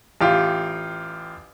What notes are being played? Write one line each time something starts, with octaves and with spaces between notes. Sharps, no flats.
A1 F4 G4